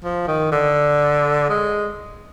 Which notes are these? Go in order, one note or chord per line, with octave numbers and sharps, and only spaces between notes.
F3
D#3
D3
G#3